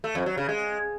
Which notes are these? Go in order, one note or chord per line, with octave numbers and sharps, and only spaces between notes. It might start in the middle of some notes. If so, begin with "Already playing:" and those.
A3
F2
F#3
C#3
G#3